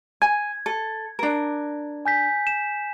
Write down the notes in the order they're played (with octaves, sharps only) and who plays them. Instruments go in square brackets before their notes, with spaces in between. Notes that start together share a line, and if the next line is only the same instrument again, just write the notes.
[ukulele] G#5 [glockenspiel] G#6
[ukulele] A4
D4 A#4
[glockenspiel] G#5 G6 B6
E7